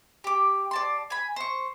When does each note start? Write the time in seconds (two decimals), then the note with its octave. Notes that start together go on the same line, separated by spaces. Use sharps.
0.24 G4 D6
0.71 D5 A5 C6
1.10 G#5 B5
1.36 C5 C#6